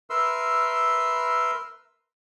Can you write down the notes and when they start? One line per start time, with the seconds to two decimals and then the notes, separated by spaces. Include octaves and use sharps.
0.10 A#4 B4 E5 C6 E6